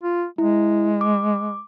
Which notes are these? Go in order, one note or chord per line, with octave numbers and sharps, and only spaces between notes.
F4
G#3 E4
D6